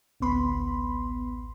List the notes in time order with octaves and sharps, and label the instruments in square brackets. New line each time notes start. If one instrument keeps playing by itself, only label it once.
[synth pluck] A1 D2 B3 B5 C6